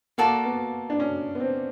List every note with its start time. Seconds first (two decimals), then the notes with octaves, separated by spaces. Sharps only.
0.18 A#3 F#4 A4 D5
0.45 B3
0.90 D4
1.00 C#4
1.35 B3
1.40 C4